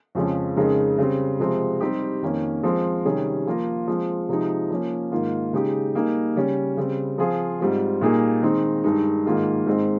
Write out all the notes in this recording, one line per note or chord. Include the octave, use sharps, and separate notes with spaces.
F2 C#3 F3 G#3 C#4
F2 C#3 G#3 D#4 A#4
C#3 G3 C4
C3 F3 G#3 C4
G3 C4 D#4 G4
F2 D#3 A#3 C#4
F3 G#3 C4
C3 D#3 G3 C#4 G#4
F3 A#3 F4 A#4
F3 G#3 C4
C3 F3 G#3 D#4
F3 A#3 C#4
G#2 D#3 A#3 F4
C#3 G#3 D#4 G4
G3 A#3 D#4 G#4
C#3 G3 C#4
C#3 G3 C4
F3 C4 F4 G#4
G#2 G3 C4 F4
A#2 G3 A#3 D#4 G#4
D#3 G#3 C4 D#4
G2 D#3 G#3 D#4
G#2 D#3 A#3 F4 G#4
G#2 D#3 G#3 C4